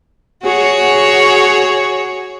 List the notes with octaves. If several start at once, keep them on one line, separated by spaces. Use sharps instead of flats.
F#4 G#4 C#5